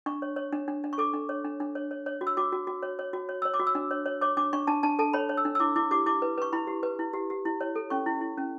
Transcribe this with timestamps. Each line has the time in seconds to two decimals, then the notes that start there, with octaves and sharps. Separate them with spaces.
0.06 D4 C#6
0.22 C#5
0.36 C#5
0.52 D4
0.68 D4
0.84 D4
0.93 C#6
0.98 A4 D6
1.14 D4
1.29 C#5
1.45 D4
1.60 D4
1.75 C#5
1.91 C#5
2.06 C#5
2.21 F#4
2.27 E6
2.37 F#4 D6
2.52 F#4
2.67 F#4
2.83 C#5
2.99 C#5
3.13 F#4
3.29 C#5
3.42 C#5 E6
3.54 D6
3.59 F#4
3.67 E6
3.75 D4
3.91 C#5
4.06 C#5
4.21 C#5 D6
4.37 D4 D6
4.53 D4 C#6
4.67 D4 A5
4.83 D4 A5
4.99 A4 A5
5.13 C#5 B5
5.29 C#5
5.37 E6
5.45 D4
5.55 E6
5.60 E4 D6
5.76 E4 D6
5.91 G4 D6
6.06 E4 D6
6.22 B4
6.38 B4 C#6
6.53 E4 B5
6.67 G4
6.83 B4
6.99 E4
7.13 G4
7.30 G4
7.45 E4
7.61 C#5
7.75 A4
7.90 C#4 C#6
8.06 E4
8.21 E4
8.38 C#4